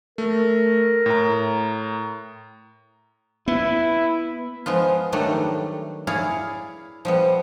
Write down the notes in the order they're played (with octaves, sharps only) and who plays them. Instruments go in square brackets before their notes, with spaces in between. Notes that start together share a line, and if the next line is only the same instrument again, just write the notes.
[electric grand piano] A3 [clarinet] A#4
[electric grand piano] A2 A#5
[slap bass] B3 [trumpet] E4
[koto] F3 G#3 B3 F4
D#3 F#3 G3 A3 D4
E4 G#4 C#5 D5 F5
F3 G3 B3